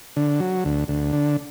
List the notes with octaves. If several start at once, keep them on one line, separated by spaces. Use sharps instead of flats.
D3
F#3
D2
D2
D3